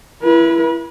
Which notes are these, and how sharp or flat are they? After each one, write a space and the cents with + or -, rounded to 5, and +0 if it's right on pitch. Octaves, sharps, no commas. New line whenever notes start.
E4 +25 B4 -35